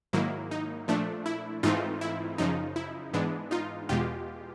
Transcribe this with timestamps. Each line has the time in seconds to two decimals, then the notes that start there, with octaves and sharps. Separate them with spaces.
0.13 G#2 D#3 F#3 A#3 E4
0.51 D#4
0.88 A#2 F3 A3 D4
1.26 E4
1.63 G#2 E3 A3 C4 D#4 F4
2.01 E4
2.38 F#2 C#3 F3 D#4
2.76 E4
3.13 G#2 E3 G#3 B3 D4
3.51 D#4 F4
3.89 E2 B2 G#3 F4 G4